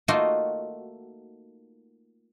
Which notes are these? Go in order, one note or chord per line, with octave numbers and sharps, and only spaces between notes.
A3 A#3 D#4 F4 F#4